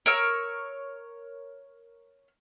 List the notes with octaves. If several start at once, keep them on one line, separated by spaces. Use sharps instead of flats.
A#4 C#5 E6